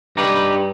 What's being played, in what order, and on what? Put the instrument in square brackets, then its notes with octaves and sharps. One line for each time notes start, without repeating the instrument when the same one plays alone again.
[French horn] G2 [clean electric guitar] D#4 G4 B4